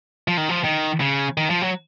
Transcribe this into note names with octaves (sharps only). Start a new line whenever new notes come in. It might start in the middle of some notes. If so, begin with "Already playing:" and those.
F3
D#3
F3
D#3
C#3
D#3
F3
F#3